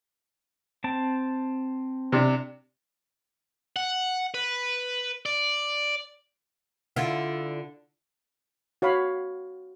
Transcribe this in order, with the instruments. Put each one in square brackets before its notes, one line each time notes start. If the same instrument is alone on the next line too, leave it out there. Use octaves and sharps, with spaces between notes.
[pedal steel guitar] C4 A5
[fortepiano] C3 D4
[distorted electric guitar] F#5
B4
D5
[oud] D3 E4 F4
[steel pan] F#4 C#5 F5 B5